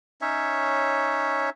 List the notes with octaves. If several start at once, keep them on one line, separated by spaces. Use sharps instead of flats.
C#4 D#4 C#5 E5